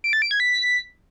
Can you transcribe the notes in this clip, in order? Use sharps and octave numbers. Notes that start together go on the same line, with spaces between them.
D7
A6
D7
G#6
B6